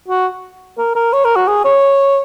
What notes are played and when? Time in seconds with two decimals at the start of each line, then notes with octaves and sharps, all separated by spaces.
0.08 F#4
0.78 A#4
0.95 A#4
1.13 C#5
1.25 A#4
1.36 F#4
1.47 G#4
1.65 C#5